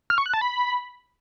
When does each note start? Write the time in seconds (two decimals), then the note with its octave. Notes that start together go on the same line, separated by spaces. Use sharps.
0.10 F6
0.18 C#6
0.26 F#6
0.34 A5
0.41 B5